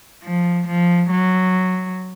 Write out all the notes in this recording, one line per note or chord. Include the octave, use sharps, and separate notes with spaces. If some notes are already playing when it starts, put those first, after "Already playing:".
F3
F3
F#3